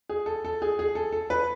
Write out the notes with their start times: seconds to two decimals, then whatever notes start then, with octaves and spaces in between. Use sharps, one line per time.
0.09 G#4
0.26 A4
0.45 A4
0.62 G#4
0.79 G#4
0.95 A4
1.13 A4
1.30 B4